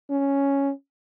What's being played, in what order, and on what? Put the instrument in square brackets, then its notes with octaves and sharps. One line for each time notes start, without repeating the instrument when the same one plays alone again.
[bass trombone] C#4